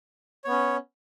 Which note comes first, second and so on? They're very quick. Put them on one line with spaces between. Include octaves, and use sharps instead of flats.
C#5 B3 C#4